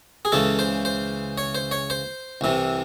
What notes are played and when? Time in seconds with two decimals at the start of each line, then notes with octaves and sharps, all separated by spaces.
0.25 G#4
0.32 C#2 C#3 E3 A4
0.59 C5
0.85 C5
1.38 C#5
1.55 C5
1.71 C#5
1.90 C5
2.41 C2 C3 E3